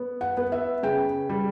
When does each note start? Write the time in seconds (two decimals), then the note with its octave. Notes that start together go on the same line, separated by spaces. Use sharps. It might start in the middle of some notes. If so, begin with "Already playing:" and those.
Already playing: B3
0.21 F#5
0.37 B3
0.52 E5
0.83 C#3 G5
1.29 G3